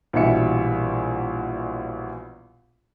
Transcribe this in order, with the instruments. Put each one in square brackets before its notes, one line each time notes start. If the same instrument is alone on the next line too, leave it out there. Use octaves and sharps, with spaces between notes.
[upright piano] A#1 E2 B2 G3 E5 C#7